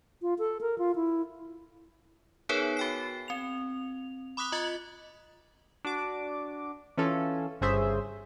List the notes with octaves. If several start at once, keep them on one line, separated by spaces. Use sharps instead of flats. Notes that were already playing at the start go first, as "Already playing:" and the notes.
F4
A4
A#4
F4
E4
B3 D#4 G#4 A#4 B4 C#5
F#4 G5 C7
C4 F7
B5 D6 D#6 F#6 B6 F7
F4 D#5 F#6 A6 C#7 F#7
D4 F#4 D6
E3 C#4 F4 A4
G1 C#3 G#4 C5 E5